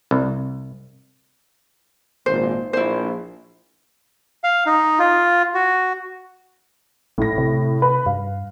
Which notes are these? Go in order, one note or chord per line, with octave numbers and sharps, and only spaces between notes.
C2
G#1 A#2 C5
A#1 E4 C5
F5
D#4
F4
F#4
A#1 A2 A#6
C3
B4
G2 F5